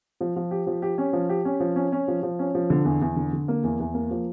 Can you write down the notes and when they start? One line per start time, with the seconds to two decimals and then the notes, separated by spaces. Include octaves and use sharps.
0.21 F3
0.36 F3
0.51 G4
0.67 F3
0.82 G4
0.98 C#4
1.13 F3
1.29 G4
1.45 C#4
1.60 F3
1.76 C#4
1.92 C#4
2.08 F3
2.23 F3
2.39 C#4
2.55 F3
2.70 D3
2.85 E2
3.01 E2
3.16 D3
3.33 D3
3.48 A#3
3.63 E2
3.80 E2
3.94 A#3
4.11 F3